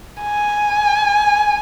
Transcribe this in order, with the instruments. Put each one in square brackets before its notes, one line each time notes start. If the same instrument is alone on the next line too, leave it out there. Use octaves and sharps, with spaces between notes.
[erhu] G#5